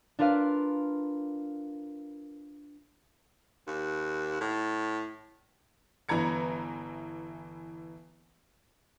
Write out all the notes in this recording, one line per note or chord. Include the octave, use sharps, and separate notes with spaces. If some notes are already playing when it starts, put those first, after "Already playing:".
D4 F4 A#4 B4 F5
D#2
A2
G1 E3 B4 A#5 G#6 C#7